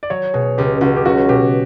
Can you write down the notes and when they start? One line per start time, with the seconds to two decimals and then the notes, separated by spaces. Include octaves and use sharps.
0.03 D5
0.10 F#3 C#5
0.34 B2 G#4
0.58 C#2 G4
0.81 C#2 F#4
0.97 G4
1.05 F#3 F#4
1.29 B2 G4